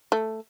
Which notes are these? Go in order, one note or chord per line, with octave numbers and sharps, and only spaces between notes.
A3